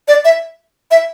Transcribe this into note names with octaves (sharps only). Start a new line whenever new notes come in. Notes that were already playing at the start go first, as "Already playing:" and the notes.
D5
E5
E5